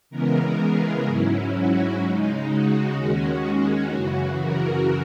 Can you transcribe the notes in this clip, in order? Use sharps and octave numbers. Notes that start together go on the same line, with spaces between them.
C#3 E3 G#3 B3 A#4
G#4
G#2 F#3 C#4 E4
F#4
C#3 G#3 D#4
F#4
D#2 D#3 G#3 C#4 F#4
F#2 C#3 E3 F#4
A#4